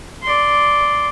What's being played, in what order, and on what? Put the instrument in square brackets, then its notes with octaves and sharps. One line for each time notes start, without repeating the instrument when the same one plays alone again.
[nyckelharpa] D5 C6